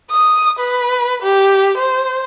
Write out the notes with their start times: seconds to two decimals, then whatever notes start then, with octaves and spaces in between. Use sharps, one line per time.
0.10 D#6
0.59 B4
1.22 G4
1.78 C5